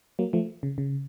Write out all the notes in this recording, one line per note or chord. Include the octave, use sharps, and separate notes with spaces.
F#3 A#3
F3 A3
C#3
C#3